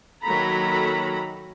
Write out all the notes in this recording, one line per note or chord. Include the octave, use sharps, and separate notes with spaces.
D#3 F#3 A#3 A4 A#5 B5